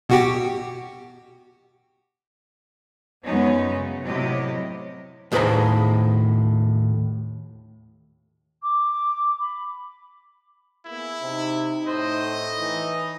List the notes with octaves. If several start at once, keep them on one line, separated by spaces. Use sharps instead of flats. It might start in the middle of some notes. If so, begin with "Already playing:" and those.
B2 F#4 G4
F#2 F#3 G#3 B3 C#4 D#4
C#3
A2 C3 F#3 E4 G4 D#5
D#2 A2 G#4 B4 C5 A#5
D6
B5
A#3 B3 E4 G#4
C3 D#4
A2 C5 D#5
E3 D#4